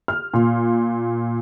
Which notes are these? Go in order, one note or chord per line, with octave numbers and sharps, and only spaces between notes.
F6
A#2